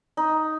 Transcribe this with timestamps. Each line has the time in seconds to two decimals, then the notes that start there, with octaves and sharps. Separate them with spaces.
0.17 D#4